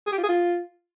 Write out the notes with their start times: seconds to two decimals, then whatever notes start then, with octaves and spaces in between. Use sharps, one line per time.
0.07 G#4
0.12 G4
0.18 F4
0.23 G#4
0.29 F4